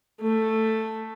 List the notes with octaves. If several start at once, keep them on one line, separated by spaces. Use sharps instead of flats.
A3